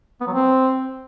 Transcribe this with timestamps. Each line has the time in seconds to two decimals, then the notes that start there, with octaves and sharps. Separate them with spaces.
0.21 B3
0.27 F#3
0.33 C4